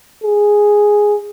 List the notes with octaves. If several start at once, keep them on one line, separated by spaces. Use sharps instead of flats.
G#4